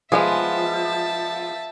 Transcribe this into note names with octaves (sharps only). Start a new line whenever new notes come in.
F3 G#3 B3 G#4 E5 A5